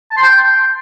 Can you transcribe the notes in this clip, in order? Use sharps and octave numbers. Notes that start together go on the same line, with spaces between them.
A5
C6
G5